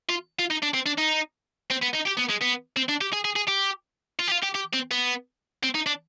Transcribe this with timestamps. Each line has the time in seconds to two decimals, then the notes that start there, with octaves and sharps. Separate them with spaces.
0.09 F4
0.39 F4
0.50 D#4
0.62 D4
0.74 C4
0.86 D4
0.98 D#4
1.70 C4
1.82 B3
1.93 D#4
2.06 G4
2.17 B3
2.29 G#3
2.41 B3
2.77 C4
2.89 D4
3.01 G4
3.13 G#4
3.25 G#4
3.36 G#4
3.48 G4
4.19 F4
4.28 G4
4.31 F4
4.43 G4
4.55 G4
4.73 C4
4.91 B3
5.63 C4
5.75 D#4
5.86 D4